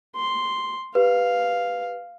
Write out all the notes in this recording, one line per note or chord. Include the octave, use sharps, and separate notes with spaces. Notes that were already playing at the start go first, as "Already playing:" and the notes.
C6
G4 B4 F5